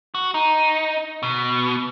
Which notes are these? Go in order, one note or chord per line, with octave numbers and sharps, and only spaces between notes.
F#4
D#4
B2